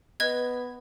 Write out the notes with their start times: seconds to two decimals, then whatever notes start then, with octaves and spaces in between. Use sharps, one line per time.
0.20 B3 B4 D#5 G#6